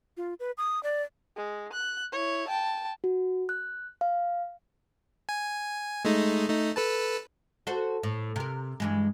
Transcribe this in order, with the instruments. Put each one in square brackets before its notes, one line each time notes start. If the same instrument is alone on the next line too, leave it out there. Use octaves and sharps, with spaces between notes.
[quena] F4
B4
D#6
D5
[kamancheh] G#3
F#6
E4 C#5
G5 A5
[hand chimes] F#4
F#6
F5
[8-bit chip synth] G#5
G#3 A3 D#4
A3 D#4
A4 B4 A5
[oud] F#4 A4 C5
A2
C3 A#4
G2 E3 G#3